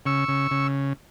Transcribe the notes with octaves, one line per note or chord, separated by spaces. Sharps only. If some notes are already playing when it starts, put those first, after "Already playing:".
C#3 C#6 E6
C#3
C#3